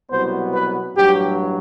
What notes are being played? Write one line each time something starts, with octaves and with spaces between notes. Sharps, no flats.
C2 B2 F#3 B3 C5
B4
A1 G2 F#3 G4